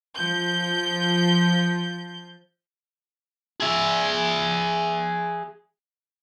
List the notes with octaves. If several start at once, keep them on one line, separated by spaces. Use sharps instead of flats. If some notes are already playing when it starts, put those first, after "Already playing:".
F3 G6
G#4 E5